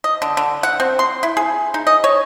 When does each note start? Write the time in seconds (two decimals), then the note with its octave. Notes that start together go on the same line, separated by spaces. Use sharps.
0.04 D#5
0.22 D3
0.37 D3
0.63 F#5
0.80 C4
0.99 C6
1.23 E4
1.37 G#4
1.74 D#4
1.87 D#5
2.04 C#5